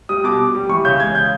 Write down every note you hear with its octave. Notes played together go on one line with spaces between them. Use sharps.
G3 D#6
B2 D6
B2
G3
E3 C#6
C#3 G6
G#3 G#6
C#3 G6